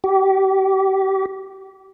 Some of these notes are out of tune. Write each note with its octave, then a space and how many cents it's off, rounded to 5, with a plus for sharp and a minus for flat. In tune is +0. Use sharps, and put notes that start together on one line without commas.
G4 -30